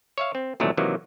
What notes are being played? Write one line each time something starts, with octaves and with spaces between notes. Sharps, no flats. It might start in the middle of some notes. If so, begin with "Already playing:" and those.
C#5 E5 F5
C4
C2 A#2 D#3 E3 F#3 A3
C3 D#3 E3 F#3 A#3